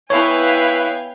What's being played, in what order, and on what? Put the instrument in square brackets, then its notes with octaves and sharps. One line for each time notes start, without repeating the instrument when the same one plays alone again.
[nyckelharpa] B3 G5 [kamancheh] E4 B4 [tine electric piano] C#5 [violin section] F5 G#5